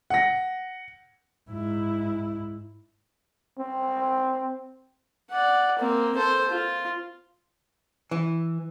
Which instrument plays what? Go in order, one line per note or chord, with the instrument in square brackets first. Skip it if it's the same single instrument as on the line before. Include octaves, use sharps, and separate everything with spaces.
[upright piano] F#5 A#6
[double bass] G#2 E4
[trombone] C4
[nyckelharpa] D5 F#5
A#3 C4
A4 C5
F4
[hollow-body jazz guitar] E3